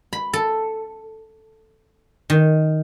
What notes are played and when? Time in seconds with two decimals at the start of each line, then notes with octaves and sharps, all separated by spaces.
0.13 B5
0.33 A4
2.30 D#3